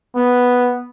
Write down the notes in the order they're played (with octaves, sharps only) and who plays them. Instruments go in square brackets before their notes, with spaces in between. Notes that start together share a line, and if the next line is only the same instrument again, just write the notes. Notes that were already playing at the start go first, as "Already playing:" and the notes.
[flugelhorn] B3